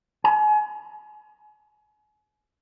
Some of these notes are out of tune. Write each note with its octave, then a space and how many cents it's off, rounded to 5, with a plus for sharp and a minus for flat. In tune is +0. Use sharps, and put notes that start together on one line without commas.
G#5 +35